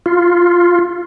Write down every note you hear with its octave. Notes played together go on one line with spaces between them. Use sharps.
F4